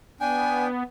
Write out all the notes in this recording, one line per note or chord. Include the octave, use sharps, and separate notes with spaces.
B3 D4 G5 G#5